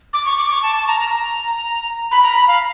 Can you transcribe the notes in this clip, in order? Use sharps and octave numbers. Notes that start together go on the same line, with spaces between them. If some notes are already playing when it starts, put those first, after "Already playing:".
D6
C#6
D6
C#6
A5
A5
A#5
A#5
B5
A#5
B5
F5